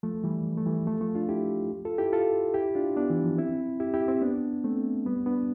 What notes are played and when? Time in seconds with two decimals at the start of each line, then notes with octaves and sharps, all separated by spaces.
0.03 F3 A3
0.24 E3 G3
0.58 A3
0.66 E3 G3
0.87 F3 A3
1.01 F3 A3
1.15 D4 F4
1.29 E4 G4
1.85 F4 A4
1.98 E4 G4
2.13 F4 A4
2.54 E4 G4
2.75 D4 F4
2.96 B3 D4
3.10 E3
3.24 F3
3.38 C4 E4
3.80 E4 G4
3.94 E4 G4
4.08 C4 E4
4.22 B3 D4
4.64 A3 C4
5.06 G3 B3
5.26 B3 D4